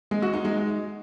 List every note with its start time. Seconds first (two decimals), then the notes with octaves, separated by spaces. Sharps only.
0.11 G#3
0.22 F#4
0.33 D#4
0.45 G#3